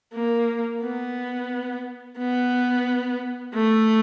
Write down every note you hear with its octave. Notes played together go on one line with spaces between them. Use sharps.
A#3
B3
B3
A3